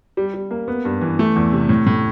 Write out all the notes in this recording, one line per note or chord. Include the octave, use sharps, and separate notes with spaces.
G3
G3
A#3
B3
G2
E3
A3
E2
C3
A2
A2